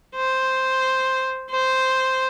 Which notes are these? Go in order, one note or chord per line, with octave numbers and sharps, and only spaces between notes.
C5
C5